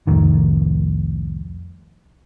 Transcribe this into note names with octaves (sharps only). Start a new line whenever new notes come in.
C2 F2 A2 D#3